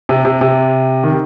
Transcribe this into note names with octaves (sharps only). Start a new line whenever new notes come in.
C3
C3
C3
D#3